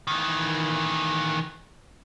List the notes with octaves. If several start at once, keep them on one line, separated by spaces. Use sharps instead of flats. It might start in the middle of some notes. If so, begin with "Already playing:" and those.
D#3 E3